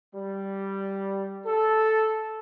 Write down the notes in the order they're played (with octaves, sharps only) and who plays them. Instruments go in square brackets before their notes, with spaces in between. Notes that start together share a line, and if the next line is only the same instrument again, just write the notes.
[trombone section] G3
A4